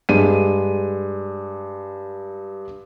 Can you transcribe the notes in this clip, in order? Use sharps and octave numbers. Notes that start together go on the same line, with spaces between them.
G2 G#3 D#7